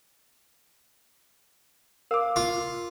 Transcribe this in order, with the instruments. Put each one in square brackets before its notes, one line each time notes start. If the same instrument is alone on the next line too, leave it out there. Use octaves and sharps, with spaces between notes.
[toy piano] A#4 [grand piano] F5 D6
[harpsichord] F4